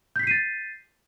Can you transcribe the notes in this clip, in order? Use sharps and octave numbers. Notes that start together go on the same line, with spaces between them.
G6 A6 B6 C7 D#7